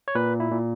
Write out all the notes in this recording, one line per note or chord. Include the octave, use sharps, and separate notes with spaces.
C#5
A#2 B4
E4
A#2